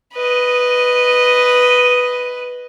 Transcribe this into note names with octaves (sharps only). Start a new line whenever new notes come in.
B4 D#5